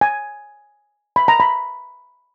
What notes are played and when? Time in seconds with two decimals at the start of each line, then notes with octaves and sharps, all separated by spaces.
0.01 G#5
1.16 B5
1.28 A#5
1.40 B5